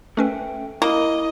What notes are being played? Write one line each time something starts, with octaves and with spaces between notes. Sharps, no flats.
A3 C#4 A4 B4 E5 G5
A#3 E4 D#5